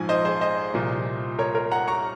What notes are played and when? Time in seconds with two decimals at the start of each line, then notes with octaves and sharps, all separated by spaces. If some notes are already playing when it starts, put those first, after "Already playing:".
Already playing: A#1 G#2 F3 G#5
0.09 C5 D#5
0.25 G#4 C5
0.41 C5 D#5
0.74 C2 A#2 F3
1.39 A#4 C#5
1.55 A#4 C#5
1.71 F#5 A#5
1.88 A#5 C#6